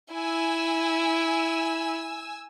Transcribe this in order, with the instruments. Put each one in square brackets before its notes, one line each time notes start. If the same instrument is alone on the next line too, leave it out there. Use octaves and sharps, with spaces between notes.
[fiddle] E4 [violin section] G#5 E6